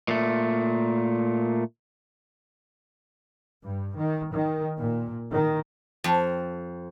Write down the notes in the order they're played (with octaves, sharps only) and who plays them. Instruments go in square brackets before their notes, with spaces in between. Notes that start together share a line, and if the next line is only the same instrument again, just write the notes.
[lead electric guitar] A#2 A3
[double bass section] G2
D#3
D#3
A#2
D#3
[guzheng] F2